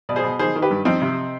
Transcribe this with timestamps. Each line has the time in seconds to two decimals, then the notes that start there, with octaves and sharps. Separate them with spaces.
0.09 B2 D5
0.16 G#4 C5
0.24 B2
0.39 D#3 G#4 C5
0.55 D#3
0.62 G4 B4
0.70 G2
0.85 F3 C4 D#4
1.01 C3